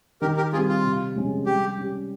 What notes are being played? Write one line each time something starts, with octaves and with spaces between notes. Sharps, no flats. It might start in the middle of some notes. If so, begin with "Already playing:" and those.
D#3 G4 A#4
G4 A#4
G3 C4 F4 G4 G#4
F4
C3
F3 G#3 C#4 G#4
G3 G4
C#4 G4